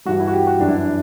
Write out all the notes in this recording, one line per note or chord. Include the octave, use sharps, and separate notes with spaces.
G2 E3 G3 F#4
E4
F#4
G4
F#4
F#2 E3 G3 D4
E4
D4